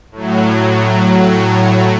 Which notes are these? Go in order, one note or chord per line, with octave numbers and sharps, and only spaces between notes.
A2 F#3